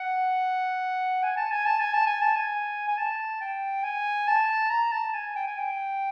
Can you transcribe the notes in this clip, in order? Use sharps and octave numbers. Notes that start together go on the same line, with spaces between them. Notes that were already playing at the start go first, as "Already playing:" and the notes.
Already playing: F#5
G#5
A5
G#5
A5
G#5
A5
G#5
A5
G#5
G#5
A5
G5
G#5
A5
A#5
A5
G#5
G5
G#5
G5